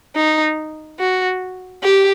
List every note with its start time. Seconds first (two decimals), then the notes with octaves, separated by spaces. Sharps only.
0.16 D#4
0.99 F#4
1.84 G4